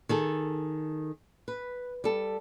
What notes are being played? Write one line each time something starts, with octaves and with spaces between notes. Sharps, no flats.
D#3 G#4 A4
B4
G3 A4